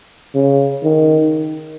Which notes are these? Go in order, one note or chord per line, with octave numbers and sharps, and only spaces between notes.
C#3
D#3